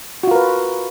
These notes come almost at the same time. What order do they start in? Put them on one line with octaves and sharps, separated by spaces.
F#4 F4 A#4 B4